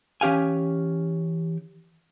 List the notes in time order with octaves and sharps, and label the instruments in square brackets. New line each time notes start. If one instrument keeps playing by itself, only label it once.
[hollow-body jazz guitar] E3 C#4 G4 F5 G#5